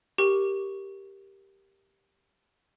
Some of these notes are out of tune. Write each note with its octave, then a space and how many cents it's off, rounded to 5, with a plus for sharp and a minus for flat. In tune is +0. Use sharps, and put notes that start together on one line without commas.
G4 +0 A#4 +0 C#6 +0